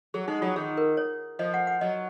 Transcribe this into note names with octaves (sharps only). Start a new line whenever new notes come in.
F#3 G#4
G#3 D#4
F#3 F4
D#3 G#4
A#4
C#5
F3 D#5
F#5
F#5
F#3 D#5